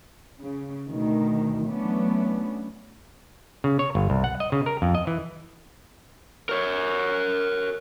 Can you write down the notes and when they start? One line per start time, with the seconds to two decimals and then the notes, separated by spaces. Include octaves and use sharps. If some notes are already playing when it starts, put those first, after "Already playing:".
0.40 C#3
0.88 D2 B2 D#3
1.65 E3 F#3 A3 B3 C#4 D4
3.64 C#3
3.79 C#5
3.95 G1
4.10 C2
4.24 F#5
4.40 D#5
4.52 C#3
4.66 A#4
4.82 F2
4.95 D#5
5.07 E3
6.49 A#4 C#5